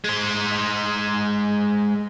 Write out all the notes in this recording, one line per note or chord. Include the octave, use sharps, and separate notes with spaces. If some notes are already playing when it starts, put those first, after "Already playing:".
G#3 C5